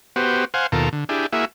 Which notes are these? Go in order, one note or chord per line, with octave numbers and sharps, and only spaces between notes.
B3 F#4 G4 C5
C5 F5 F#5 G#5
D#2 B2 F4 A4 A#4
D3
D4 E4 G4 G#4
A#3 E4 F#4 G#4 E5